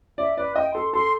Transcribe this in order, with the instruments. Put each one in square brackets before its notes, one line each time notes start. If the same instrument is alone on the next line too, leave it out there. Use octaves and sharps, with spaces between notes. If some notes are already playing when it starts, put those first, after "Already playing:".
[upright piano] D5 [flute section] E5
[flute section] B4 [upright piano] D5
[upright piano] D#5 [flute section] G5
[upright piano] A4 [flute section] C6
[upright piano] A4 [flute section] C6